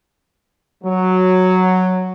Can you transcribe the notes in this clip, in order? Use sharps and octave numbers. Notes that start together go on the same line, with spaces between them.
F#3